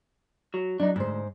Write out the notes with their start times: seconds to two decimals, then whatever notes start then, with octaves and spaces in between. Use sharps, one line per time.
0.54 F#3
0.80 F#3 D4 D#4
0.96 D2 G#2 C5